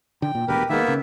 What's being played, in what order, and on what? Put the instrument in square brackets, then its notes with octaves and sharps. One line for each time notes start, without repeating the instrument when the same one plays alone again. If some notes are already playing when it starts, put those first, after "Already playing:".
[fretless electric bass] D3 [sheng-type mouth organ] G5
[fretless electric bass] A#2
[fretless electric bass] E1 D2 B3 [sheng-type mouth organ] G4 A#4 B4
[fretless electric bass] D#3 G#3 [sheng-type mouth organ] A#3 B3 E5
[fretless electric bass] C#3